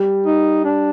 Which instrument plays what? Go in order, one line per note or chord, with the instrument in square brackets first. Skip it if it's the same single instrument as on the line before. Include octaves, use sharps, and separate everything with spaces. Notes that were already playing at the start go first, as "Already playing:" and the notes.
Already playing: [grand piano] G3
[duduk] D#4
D4